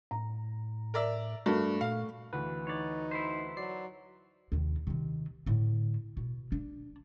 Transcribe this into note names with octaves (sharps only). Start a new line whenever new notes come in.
A2 A#5
A#4 D5 E5
G2 A3 F#4 A#4
A#2 F5
D2 E3 B4
D#4 C#5 D5
E4 B4 C5
F#3 D5 C7
D#2 C3
C3 D#3
A2 D3
B2
D4